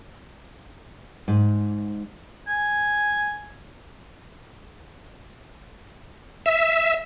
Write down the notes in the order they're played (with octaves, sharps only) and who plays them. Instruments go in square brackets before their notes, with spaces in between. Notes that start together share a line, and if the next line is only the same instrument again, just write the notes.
[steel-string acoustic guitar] G#2
[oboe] G#5
[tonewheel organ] E5